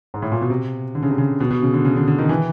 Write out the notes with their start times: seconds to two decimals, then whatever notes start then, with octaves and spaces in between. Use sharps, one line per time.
0.14 G#2
0.22 A2
0.32 A#2
0.42 B2
0.50 C3
0.95 D3
1.03 C#3
1.10 C3
1.18 C#3
1.40 B2
1.51 B2
1.62 C#3
1.74 D3
1.85 C#3
1.96 D3
2.08 D3
2.18 D#3
2.29 E3